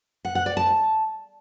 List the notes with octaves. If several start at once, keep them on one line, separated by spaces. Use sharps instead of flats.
F#5
F#5
D5
A5